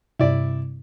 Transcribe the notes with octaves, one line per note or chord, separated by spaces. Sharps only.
G2 C3 E4 D5